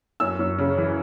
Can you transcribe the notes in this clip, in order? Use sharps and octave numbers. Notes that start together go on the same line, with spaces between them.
F#2 E6
F#2
C#3
E3